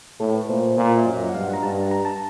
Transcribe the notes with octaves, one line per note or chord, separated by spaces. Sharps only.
A2 A4
B4
A#2 C5
A#2
E5
F#2 D#5
F#5
G2 F5
F#5
A#5
G2 A5
A#5
A5